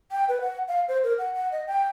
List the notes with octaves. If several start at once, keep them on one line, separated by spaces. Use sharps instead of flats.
G5
B4
F#5
F5
C5
A#4
F#5
F#5
D#5
G5